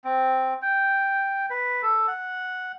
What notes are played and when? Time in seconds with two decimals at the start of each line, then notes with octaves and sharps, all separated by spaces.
0.05 C4
0.62 G5
1.50 B4
1.83 A4
2.08 F#5